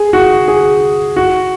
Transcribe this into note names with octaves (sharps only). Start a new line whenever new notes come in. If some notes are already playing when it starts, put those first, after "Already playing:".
Already playing: G#4
F#4
G#4
F#4